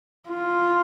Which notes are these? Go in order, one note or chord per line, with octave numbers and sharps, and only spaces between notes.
F4